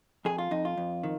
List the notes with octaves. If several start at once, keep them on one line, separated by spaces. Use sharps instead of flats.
F2 G#4
F4
F2 D#4
F4
F2
D#3